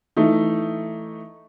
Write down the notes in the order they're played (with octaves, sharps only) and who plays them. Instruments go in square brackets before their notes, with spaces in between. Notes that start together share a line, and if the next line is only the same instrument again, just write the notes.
[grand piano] E3 A3 D#4